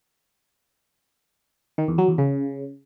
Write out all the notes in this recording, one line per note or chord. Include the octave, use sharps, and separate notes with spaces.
D#3
E2
F#3
E2
C#3